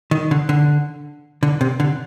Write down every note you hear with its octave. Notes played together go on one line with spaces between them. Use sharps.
D#3
D3
D3
D3
C3
D3